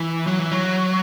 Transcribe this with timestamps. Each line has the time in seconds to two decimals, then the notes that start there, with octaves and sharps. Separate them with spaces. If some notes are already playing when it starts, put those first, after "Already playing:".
Already playing: E3
0.27 F#3
0.39 E3
0.51 F#3